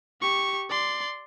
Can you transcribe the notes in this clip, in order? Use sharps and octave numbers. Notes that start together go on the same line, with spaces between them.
G4 C#6
D5 C6